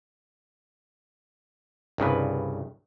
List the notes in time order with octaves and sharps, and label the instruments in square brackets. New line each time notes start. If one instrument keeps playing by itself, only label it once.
[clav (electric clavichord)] C2 G2 C#3 B4